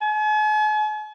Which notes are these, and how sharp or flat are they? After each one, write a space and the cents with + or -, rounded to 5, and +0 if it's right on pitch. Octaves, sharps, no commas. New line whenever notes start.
G#5 +45